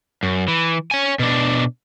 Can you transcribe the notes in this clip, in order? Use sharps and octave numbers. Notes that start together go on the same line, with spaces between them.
F#2
E3
C#5 G#5
B2 D4